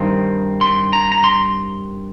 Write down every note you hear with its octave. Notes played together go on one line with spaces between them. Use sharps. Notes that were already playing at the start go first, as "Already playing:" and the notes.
Already playing: G2 D#3 C4
C6
A#5
A#5
C6